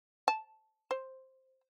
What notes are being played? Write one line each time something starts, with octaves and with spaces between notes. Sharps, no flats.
A5
C5